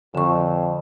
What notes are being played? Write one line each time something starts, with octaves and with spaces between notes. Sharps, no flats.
F2 D3 C#6